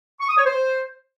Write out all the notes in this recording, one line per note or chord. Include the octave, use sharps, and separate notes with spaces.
C#6
D#6
C#5
C5